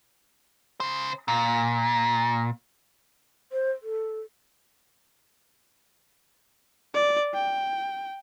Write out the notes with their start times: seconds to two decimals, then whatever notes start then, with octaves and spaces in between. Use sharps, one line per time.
0.80 C#3 C5
1.28 A#2
3.52 C5
3.82 A4
6.94 D5
7.34 G5